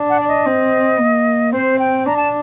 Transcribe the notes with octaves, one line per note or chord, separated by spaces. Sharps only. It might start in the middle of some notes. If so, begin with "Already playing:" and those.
Already playing: D4
F#5
D5
D#5
C4
A#3
C4 C5
G5
D4 A#5
A5